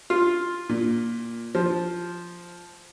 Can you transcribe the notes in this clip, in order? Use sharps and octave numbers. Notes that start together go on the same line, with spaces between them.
F4
A#2
F3